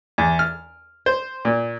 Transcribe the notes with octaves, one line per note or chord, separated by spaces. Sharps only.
E2
F6
C5
A#2